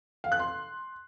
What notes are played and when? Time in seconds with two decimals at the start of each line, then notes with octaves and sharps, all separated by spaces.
0.24 F5
0.32 F#6
0.39 C6